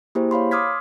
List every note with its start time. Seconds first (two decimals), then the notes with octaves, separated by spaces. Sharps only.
0.15 A#3 E4 G4 G#4 C5
0.31 C#5 F5 B5 C6
0.51 C6 D6 D#6 F6 G#6 B6